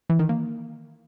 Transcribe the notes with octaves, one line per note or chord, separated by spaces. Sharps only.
E3
D#3
A#3